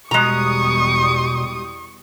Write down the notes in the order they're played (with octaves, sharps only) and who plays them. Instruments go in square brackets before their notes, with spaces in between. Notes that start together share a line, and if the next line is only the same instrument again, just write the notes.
[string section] E2 G3 D#6 [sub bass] B2 [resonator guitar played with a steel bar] G#3 A#5 [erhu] C#6